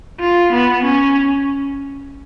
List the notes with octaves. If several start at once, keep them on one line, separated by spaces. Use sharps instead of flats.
F4
B3
C#4